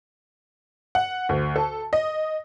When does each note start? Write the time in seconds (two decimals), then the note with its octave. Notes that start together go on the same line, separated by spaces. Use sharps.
0.95 F#5
1.29 D2
1.56 A4
1.93 D#5